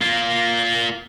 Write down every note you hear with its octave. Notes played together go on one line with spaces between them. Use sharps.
A#3 F4